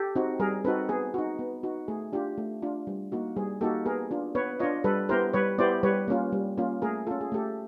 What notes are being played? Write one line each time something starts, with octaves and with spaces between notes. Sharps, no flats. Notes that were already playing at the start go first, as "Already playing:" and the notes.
Already playing: G4 A4
C4 D#4 F#4
G3 G#4 A#4
C4 D#4 F#4 A4 B4
B3 G#4
D#4 F#4
B3
D#4 F#4
A3 G#4
D4 F4 G4
A3
D4 F4
G3
A#3 D#4 F#4
G3 G#4
A#3 D#4 F#4 G4 A4
B3 G#4 A#4
D4 F4
B3 B4 C#5
D4 F4 C#5 D#5
G3 A4 B4
B3 E4 G4 A#4 C5
G3 B4 C#5
B3 E4 G4 C5 D5
G3 B4 C#5
A#3 C#4 F4
G3
A#3 C#4 F4
A3 G#4 A#4
C#4 F4 A4
G#4
A3 G4 A4